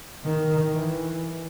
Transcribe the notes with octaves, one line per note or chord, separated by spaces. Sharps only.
D#3
E3